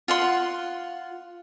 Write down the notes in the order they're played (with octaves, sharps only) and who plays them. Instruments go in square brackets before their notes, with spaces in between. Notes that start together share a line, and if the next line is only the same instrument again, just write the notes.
[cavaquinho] F4 F#5 C6